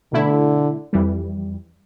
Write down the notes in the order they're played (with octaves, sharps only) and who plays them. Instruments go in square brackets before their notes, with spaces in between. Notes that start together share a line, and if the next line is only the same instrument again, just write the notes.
[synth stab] B2 A3 E4 [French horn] D3
[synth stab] F2 E3 G3